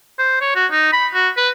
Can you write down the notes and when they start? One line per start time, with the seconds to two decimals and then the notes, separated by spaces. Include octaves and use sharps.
0.19 C5
0.41 C#5
0.55 F#4
0.71 D#4
0.93 B5
1.14 F#4
1.37 B4